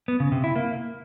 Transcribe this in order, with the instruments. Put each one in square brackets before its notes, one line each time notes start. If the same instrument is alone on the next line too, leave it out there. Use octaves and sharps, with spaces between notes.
[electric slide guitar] B3
C#3
C3
E4
A#3